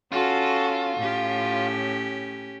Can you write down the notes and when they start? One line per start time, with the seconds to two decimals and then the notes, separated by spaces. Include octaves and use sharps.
0.12 C#4 F4 F#4 A4
0.98 A2 C#4 G4